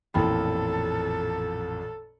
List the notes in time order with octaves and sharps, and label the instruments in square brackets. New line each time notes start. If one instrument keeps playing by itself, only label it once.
[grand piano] A1 F2 A#2 [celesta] E4 G5 B5 [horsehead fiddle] A4